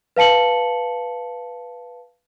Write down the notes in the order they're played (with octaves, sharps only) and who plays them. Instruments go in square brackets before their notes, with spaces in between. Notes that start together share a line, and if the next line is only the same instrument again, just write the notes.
[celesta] B4 F5 A5 C#7 F#7